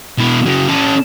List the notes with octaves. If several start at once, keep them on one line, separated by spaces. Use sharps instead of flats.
B2 E4
C#3 F#3
C#4 A4